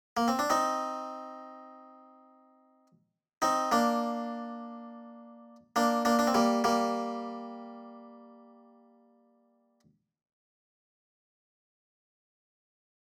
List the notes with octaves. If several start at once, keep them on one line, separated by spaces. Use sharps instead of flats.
A#3
C4
D4
C4 D#4
C4 D#4
A#3 D4
A#3 D4
A#3 D4
D4
C4
G3 A#3
G3 A#3